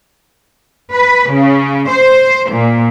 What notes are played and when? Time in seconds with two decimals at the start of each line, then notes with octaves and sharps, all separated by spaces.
0.93 B4
1.31 C#3
1.89 C5
2.51 A#2